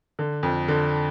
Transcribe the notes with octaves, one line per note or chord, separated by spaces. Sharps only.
D3
F2
D3